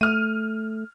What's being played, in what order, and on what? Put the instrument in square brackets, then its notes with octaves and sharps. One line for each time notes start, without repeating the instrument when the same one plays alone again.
[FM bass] A3 [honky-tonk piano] F6 D#7